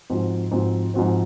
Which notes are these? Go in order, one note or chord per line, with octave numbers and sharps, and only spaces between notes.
G#2 F3 C4 F#4 C5
G#2 F3 C4 F#4 C5
G#2 F3 C4 F#4 C5